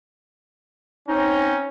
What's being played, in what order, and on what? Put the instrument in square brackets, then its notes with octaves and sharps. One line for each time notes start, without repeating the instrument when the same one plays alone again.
[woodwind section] C4 D#4 [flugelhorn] C#4